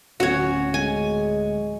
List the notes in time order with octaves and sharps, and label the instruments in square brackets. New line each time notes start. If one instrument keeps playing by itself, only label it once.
[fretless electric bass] D1 [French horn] C#4 [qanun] F#4 C#5
[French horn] G#3 [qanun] G#5